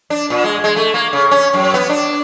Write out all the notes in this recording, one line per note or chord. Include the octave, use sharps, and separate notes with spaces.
D4
A#2
G#3
G#3
A3
A#3
C#3
C#4
F#2
B3
D4